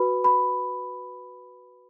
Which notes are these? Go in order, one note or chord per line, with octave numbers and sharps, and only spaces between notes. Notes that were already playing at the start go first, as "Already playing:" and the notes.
Already playing: F#4 B4 B5
B5